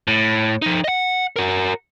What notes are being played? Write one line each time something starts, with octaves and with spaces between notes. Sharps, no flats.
A2
F3 D#4
D#5 F#5
F#4 A#4